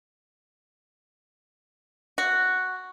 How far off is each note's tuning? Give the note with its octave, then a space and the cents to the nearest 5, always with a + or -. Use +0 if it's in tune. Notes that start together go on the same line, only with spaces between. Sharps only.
F#4 +0